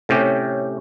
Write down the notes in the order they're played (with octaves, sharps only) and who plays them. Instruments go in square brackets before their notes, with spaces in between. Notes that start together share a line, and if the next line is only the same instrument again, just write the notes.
[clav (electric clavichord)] A2 C3 C#4 G4